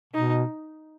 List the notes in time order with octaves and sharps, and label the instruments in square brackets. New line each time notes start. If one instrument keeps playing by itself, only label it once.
[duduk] B2 [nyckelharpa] D#4